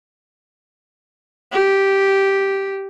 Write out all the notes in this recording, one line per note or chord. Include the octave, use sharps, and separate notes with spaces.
G4